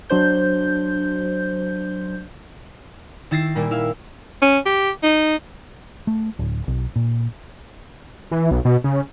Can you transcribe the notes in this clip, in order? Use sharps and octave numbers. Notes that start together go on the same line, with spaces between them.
F#3 D4 C5 G6
D#3 E4 A6 A#6 C7 E7
A#2 G3 A#3 E4
E4 E5 F5
C#4
G4
D#4
A3
D1
B1
A#2
E3
B1
B2
C#3